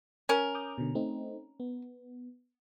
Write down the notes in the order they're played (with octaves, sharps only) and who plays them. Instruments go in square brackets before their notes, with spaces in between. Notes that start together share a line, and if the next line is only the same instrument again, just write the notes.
[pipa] C#4 A#4
[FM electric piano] D6 D#6 G6
B2 D3
A3 C4 D#4
B3